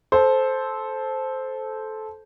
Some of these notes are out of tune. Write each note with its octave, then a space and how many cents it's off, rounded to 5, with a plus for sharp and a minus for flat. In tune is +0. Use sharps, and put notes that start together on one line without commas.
A4 -15 C5 +0